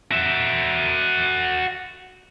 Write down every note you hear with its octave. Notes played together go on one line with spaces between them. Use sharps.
F#4 E5